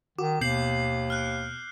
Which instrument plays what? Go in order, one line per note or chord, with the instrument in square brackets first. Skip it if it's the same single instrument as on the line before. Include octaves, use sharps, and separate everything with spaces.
[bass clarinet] D#3 [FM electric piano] F#4 [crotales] D6
[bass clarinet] D#2 [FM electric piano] B2 [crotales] G6 C7 F#7
[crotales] F6 F#6